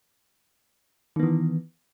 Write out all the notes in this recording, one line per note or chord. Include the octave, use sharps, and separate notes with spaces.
D#3 E3 B3